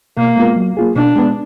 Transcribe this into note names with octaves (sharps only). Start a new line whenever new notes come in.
B2 A#3
G#3 B3 F4 A#4
F#3
A#3 F4 G#4
B2 D4
G#3 B3